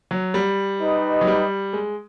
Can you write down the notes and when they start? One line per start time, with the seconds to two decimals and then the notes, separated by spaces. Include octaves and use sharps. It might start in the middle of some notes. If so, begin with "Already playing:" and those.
0.11 F#3
0.34 G3
0.80 D#4 G4 B4 D#5
1.21 F#3
1.27 G3
1.73 G#3